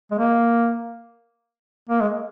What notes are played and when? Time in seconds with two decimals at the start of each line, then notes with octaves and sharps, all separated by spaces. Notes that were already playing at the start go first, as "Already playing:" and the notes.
0.11 G#3
0.19 A#3
1.89 A#3
2.00 G#3